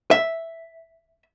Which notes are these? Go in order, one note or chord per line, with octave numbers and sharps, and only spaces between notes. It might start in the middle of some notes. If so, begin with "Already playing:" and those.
E5